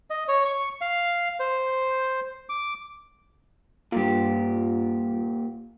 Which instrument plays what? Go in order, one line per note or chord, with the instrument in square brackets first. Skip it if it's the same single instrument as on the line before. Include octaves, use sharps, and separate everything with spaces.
[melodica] D#5
C#5
C#6
F5
C5
D6
[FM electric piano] G2 F4 [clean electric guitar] A#2 G4